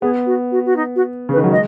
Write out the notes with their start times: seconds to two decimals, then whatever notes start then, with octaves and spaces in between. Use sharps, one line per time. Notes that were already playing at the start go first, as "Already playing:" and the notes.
0.02 B3 G#4
0.26 F#4
0.52 F#4
0.66 F#4
0.76 D#4
0.96 F#4
1.29 C#3
1.33 B4
1.37 D#3
1.44 F#3
1.51 G#3 D#5